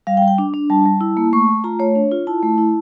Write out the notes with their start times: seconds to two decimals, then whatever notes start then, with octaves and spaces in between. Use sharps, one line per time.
0.07 G3 F5
0.17 G5
0.22 G3
0.28 G5
0.38 D4
0.54 D4
0.70 G3 A5
0.86 G3
1.01 E4
1.17 A#3
1.33 A3 C#6
1.49 A3
1.64 F4 A#5
1.79 A3 C#5
1.95 D4
2.11 F4
2.27 E4 A5
2.43 A3
2.58 E4